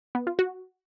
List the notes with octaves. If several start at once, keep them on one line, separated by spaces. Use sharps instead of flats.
B3
F4
F#4